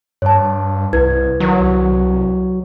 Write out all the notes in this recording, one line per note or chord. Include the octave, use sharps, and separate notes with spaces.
G2 C#5 A5
C2 E4 B4 G#6
D#3 F#3
C2